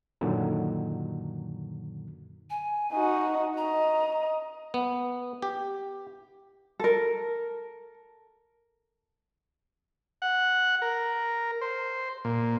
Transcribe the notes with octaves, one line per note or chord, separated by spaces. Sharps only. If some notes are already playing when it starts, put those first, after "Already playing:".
F#2 A#2 D3 D#3 F#3
G#5
D#4 F#4
D#5 A#5
B3
G4
A4 A#4
F#5
A#4
C5
A#2